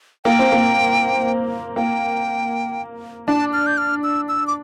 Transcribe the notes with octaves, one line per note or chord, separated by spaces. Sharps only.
A#3 G5
C4
A#3
A#3 G5
D4 A5
F6
G6
F6
E6
E6
D6